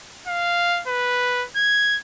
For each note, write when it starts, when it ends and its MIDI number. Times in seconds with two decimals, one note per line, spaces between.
0.28 0.82 77
0.88 1.45 71
1.56 1.99 92